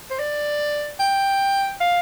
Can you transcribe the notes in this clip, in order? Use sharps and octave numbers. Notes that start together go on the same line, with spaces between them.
C5
D5
G5
F5